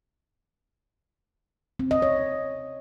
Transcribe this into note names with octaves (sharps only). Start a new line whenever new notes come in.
C4
D#5
C#5